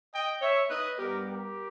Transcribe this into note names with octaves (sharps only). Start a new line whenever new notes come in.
D#5 G5
C#5 E5
B4 D#5
G2 G3 B3 G4 A#4
G4 A#4